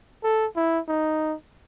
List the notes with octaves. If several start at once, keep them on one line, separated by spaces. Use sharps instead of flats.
A4
E4
D#4